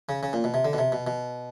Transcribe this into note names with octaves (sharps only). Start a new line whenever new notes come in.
C#3
C#3
A#2
B2
C3
D3
B2
C3
B2
B2